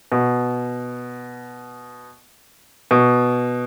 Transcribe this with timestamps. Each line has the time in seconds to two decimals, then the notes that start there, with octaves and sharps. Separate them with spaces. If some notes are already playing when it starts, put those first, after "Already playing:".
0.12 B2
2.91 B2